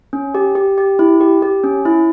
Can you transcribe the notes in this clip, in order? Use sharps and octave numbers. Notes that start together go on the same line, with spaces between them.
C#4
G4
G4
G4
E4
G4
G4
C#4
E4